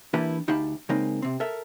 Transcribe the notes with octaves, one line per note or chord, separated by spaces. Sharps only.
E3 A#3 D4 E4 G4 B4
D2 D#4 G4 F5 A5 B5
C#3 G#3 A#3 C4 D#4
C3 C4
A4 A#4 E5